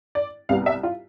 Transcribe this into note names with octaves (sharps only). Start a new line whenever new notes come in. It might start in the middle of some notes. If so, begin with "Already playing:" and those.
D5
C2 C3 G3 B3 F5
E5
F4